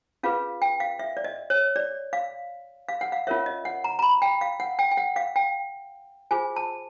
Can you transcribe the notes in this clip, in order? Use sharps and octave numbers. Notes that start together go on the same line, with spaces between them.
C#4 F4 G#4 B4 F5
G5
F5
E5
D5
D#5
C#5
D5
F5
F5
F#5
F5
C#4 F4 A#4 C#5 E5
D#5
F#5
A#5
A#5
B5
G5
F5
F#5
G5
G5
F#5
F5
G5
F4 G#4 C5 G#5
A5